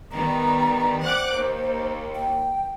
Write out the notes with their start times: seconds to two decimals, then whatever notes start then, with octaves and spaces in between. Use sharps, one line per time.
0.12 D#3 G3 B3 A#5
1.02 C5 F#5 D6 F#6
1.34 D#2
2.15 G5